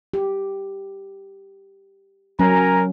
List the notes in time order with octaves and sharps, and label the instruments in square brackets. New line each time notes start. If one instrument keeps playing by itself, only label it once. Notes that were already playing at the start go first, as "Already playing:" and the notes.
[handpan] G4
[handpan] F#3 C#4 [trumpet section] A#4 G#5 A#5